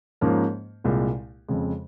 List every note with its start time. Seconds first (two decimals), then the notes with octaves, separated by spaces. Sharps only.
0.21 G#2 F3 A#3 C#4
0.84 C2 A#2 G#3
1.49 F2 C#3 G#3